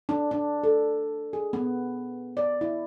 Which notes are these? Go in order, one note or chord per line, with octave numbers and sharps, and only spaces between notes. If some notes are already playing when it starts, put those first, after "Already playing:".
D4
D4
A4
G#4
B3
D5
E4